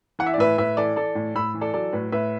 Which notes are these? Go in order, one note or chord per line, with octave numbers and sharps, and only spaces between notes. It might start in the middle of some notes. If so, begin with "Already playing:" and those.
E3 F#5
E5
D5
A2 B4 E5
A2 B4 E5
E3 A4 D5
E3 A4 D5
A2
A2 B5 E6
E3
A4 D5
F#3 A4 D5
A2 B4
A2 B4 E5